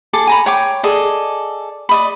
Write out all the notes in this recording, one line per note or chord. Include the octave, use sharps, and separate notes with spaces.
G#4 A4 D6
G#5 A#5 B5
C#5 G5 D6
G#4 A4 D5 D#5
D5 D#5 B5